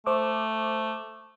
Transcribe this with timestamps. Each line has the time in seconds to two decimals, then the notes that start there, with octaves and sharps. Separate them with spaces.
0.06 A3 C5 D6